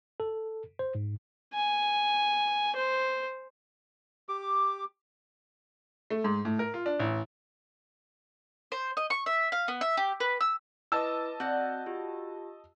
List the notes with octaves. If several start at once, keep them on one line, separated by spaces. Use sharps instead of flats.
A4
C5
G#2
G#5
C5
G4 D6
A3
G#2
A2
A#4
F4
D4
A1
C5
D#5
C#6
E5
F5
B3
E5
G4
B4
E6
E4 B4 D#5 A5 D6 E6
C4 F#4 D5 F#5 F#6 G6
F4 G4